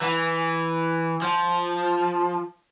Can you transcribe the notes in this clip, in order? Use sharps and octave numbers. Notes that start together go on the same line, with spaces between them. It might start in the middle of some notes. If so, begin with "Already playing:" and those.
E3
F3